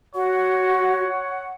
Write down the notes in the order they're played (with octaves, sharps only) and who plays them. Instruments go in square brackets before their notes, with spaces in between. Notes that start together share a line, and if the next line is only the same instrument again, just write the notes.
[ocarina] F#4 [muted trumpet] C#5 [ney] F#5